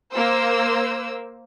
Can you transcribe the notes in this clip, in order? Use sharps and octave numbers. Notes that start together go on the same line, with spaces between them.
A#3 C5 E6